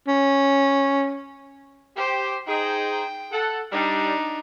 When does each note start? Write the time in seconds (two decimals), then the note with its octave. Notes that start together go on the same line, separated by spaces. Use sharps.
0.08 C#4
1.97 G4 C5
2.48 D#4 G#4 C5 G5
3.32 A4 F#5
3.72 G3 D4 D#4